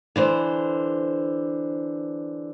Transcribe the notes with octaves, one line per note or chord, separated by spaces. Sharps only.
D3 E3 C5